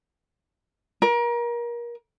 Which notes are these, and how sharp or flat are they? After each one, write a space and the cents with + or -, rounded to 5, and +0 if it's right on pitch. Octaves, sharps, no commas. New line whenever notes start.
A#4 +30